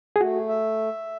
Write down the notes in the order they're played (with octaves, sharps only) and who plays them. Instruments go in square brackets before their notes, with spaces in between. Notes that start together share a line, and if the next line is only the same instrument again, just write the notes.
[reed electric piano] G#4
[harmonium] A3 [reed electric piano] F#4
[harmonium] E5